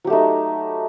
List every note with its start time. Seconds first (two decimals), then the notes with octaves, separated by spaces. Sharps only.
0.04 F#3
0.07 G4
0.10 A3
0.13 D#4